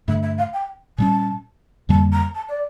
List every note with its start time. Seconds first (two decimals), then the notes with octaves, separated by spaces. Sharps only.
0.07 G2 D3 A3 E5
0.22 E5
0.38 F5
0.53 G5
0.98 A#2 G3 C#4 A5
1.89 F2 D3 G3 A#3 A5
2.12 A#5
2.34 A5
2.48 D5